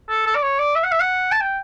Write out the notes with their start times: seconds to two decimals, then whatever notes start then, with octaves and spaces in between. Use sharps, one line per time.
0.10 A4
0.26 A4
0.35 D5
0.43 C#5
0.59 D5
0.76 E5
0.84 F#5
0.92 E5
1.00 F#5
1.32 A5
1.41 G5